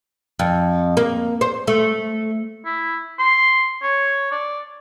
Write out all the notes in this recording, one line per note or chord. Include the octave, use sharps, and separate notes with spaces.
F2
A#3
C5
A3
E4
C6
C#5
D5